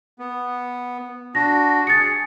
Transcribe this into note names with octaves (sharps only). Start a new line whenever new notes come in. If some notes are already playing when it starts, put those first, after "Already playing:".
B3
D4 F#4 A#6
G#4 A6 C#7